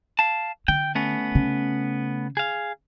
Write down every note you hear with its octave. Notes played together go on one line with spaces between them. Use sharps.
F5 A5
D3 G5
A3 B3 C#4
C#3
G#4 F5